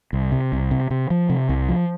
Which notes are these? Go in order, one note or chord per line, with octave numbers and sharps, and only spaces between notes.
C2
C3
C2
C3
C3
F3
C3
C2
F3